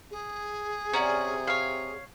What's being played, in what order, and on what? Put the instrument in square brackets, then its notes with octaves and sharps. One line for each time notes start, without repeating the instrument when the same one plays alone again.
[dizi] G#4
[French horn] C3 [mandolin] C#4 [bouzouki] D5 F#5 A#5
[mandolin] C#5 F5